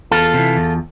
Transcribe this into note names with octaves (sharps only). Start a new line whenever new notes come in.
E2 F4 A4
C3 E3
E2